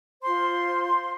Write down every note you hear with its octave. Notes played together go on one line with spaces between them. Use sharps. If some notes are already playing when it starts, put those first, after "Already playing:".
F4 C5 C6